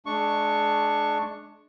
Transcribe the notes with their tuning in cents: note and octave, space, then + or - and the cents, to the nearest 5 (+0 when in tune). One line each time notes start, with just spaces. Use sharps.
G#3 +35 D4 +10 C#6 +0